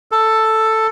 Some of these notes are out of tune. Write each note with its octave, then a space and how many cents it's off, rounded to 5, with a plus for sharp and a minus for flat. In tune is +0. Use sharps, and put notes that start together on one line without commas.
A4 +5